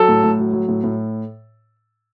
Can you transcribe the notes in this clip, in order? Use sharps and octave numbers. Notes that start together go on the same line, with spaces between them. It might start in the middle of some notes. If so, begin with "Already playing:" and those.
Already playing: F#3 A4
A2
A2
F#3
F#3
A2
A2